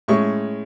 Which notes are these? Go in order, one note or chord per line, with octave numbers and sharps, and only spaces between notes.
A2 G#3 C#4 C#6